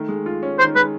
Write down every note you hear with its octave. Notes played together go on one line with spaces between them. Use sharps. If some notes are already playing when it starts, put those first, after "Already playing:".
Already playing: D#3 A3
G#3
F4
C#4
D#3 C5
G#3 B4